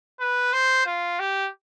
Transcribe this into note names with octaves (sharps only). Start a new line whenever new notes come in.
B4
C5
F4
G4